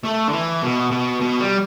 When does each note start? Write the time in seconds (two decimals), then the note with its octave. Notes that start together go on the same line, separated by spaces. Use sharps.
0.04 A3
0.28 D3
0.33 E3
0.62 B2
0.91 B2
1.21 B2
1.40 G3